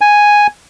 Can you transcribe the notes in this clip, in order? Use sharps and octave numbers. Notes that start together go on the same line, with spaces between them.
G#5